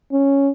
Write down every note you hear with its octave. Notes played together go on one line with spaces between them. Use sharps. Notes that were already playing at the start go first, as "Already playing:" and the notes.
C#4